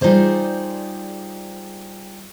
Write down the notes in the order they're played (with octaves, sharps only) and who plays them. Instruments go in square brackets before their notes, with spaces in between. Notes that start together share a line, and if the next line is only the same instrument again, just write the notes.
[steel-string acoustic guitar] G3 D#4 F4 G#4 C5 D5